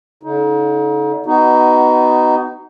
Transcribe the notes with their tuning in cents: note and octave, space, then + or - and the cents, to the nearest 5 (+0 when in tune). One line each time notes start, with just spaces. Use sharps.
D3 -35 D#4 +30
B3 +15 D#4 +0 F#4 +30